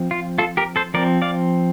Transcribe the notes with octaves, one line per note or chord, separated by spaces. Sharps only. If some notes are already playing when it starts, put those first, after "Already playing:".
Already playing: F3 C4
F4
F4 A4
G4 A#4
A4 C5
F3 C4 A#4 D5
D5 F5